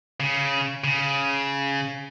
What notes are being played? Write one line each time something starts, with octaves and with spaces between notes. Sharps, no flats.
C#3
C#3